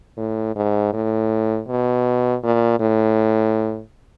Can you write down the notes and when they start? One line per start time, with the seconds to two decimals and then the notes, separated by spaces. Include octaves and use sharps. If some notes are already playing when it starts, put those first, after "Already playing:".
0.17 A2
0.56 G#2
0.93 A2
1.68 B2
2.44 A#2
2.80 A2